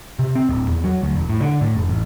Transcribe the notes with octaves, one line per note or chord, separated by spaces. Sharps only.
C3
C4
D1
E2
F#3
D2
E1
A2
D3
A2
F1
A1